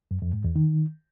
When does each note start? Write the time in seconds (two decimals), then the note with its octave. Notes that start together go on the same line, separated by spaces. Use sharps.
0.11 F#2
0.22 F2
0.33 G#2
0.44 E2
0.56 D#3